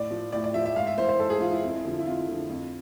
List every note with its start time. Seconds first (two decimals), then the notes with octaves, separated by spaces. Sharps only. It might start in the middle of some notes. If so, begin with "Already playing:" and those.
Already playing: A2 D5
0.11 F3
0.32 A2 D5
0.44 D5
0.54 F3 E5
0.66 E5
0.76 G#2 F5
0.87 E5
0.98 E3 C5
1.08 C5
1.19 G#2 A4
1.30 G#4
1.40 E3 F4
1.52 E4
1.63 F2
1.85 D3 F3
1.99 E4
2.06 F2 F4
2.28 D3 F3
2.50 F2